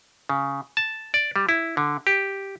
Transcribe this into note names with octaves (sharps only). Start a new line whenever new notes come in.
C#3
A5
D5
G3
E4
D3
G4